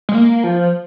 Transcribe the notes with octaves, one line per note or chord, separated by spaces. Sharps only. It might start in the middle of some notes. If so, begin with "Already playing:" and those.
G#3
A#3
F3